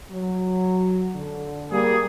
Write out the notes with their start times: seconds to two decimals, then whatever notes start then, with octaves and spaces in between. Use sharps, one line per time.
0.11 F#3
1.16 D3
1.71 G3 A#3 G#4